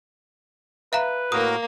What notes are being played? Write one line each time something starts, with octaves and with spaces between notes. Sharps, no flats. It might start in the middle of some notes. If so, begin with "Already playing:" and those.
B4 E5 F5 A#5
A2 A#3 F#4 A#4 D#6